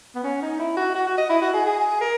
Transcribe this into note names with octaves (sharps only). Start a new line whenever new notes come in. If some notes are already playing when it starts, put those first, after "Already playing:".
B3
C#4
D#4
E4
F#4
F#4
F#4
D#5
E4
F#4
G#4
G#4
A#4